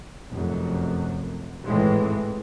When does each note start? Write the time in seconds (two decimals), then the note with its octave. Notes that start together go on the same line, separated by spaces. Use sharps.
0.30 F1 F#2
1.65 G#1 A2 E3 G#3